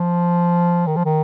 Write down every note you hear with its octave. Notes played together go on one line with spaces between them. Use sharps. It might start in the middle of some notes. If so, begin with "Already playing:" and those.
Already playing: F3
D#3
F3
D#3